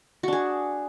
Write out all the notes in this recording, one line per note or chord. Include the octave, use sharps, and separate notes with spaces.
D4 F#4 G#4